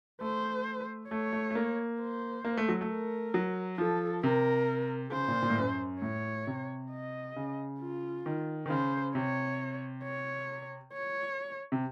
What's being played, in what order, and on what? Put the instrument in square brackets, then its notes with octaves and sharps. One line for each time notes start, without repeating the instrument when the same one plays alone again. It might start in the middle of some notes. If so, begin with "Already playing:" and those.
[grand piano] A3 [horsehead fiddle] C5
[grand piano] A3 [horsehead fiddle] C#5
[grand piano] A3
A3
A#3
[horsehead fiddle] C5
[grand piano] A#3
A3
F#3
A3
[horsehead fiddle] A#4
[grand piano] F#3
[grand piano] F3 [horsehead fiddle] A4
[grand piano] C3 [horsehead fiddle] A#4
[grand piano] C#3 [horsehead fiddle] C5
[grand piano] A#2
A#2
A2
F#2
[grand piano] A2 [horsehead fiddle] C#5
[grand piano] C3
[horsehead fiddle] D#5
[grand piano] C#3
[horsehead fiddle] F4
[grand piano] D#3
D#3
[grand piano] C#3 [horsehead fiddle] C5
[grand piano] C3 [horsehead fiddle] C#5
[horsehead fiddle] C#5
C#5
[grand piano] C3